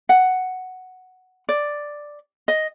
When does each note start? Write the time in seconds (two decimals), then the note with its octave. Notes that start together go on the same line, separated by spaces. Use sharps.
0.09 F#5
1.49 D5
2.48 D#5